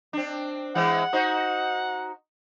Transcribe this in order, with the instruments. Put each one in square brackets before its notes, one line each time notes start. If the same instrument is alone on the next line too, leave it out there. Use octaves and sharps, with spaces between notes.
[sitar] C4 D4
[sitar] E3 G#3 C4 [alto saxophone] F#5
[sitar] D#4 F#4 C5